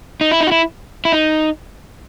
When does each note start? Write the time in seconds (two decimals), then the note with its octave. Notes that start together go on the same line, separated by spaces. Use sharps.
0.21 D#4
0.32 E4
0.41 D#4
0.47 F#4
0.52 E4
1.05 E4
1.13 D#4